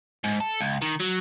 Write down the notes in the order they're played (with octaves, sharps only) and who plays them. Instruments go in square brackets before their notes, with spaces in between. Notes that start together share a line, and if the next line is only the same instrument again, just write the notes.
[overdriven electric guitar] G#2
A4
C#2
D#3
F#3